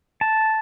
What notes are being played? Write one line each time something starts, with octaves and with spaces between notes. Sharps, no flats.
A5